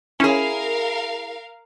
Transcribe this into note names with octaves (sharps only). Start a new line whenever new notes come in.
C#4 E4 G#4 A#4 F5